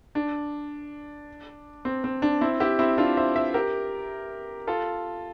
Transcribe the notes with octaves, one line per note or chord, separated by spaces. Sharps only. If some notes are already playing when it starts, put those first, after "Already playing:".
D4
C4
C4
D4
C4 E4
E4 G4
C4 E4
D4 F4
C5 E5
C5 E5
G4 A#4
F4 A4